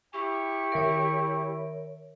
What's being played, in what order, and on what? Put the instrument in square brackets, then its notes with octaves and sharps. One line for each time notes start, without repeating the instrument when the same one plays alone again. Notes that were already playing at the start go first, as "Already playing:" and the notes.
[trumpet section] E4 G5 C#6 [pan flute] G4
[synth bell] D#3 E5 D7 [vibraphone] A#4 C#5